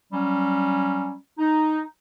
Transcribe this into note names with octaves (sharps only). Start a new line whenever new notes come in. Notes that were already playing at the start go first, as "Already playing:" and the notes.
F#3 G3 C#4
D#4